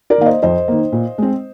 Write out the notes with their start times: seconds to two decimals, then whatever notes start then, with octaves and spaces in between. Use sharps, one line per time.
0.10 A#4 D5
0.18 D#3 A#3 F5
0.26 C5 D#5
0.43 F2 C5 D#5
0.68 D#3 A#3
0.92 A#2
1.18 G#3 C4